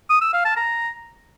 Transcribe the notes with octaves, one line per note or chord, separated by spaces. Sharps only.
D#6
E6
F5
A5
A#5